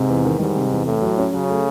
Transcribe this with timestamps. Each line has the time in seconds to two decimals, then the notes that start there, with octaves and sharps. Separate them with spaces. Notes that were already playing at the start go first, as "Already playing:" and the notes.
Already playing: G#2 C3
0.09 E2
0.24 D#3
0.39 G#2 G3
0.56 C3
0.71 E2
0.86 A2 A3
1.02 F#3
1.18 C#4
1.33 C#3 F#3
1.49 A3